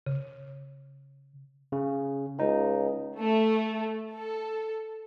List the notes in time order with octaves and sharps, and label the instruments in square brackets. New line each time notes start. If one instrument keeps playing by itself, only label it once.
[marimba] C#3
[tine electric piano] C#3
[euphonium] C#2 [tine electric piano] D#4
[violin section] A3
A4